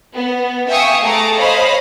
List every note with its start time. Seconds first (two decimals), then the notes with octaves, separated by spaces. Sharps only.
0.15 B3
0.68 E5 F5 G5 G#5 C#6 D#6
1.02 A3 G#4 A5 A#5 D6
1.38 C5 C#5 D#5 F5 B5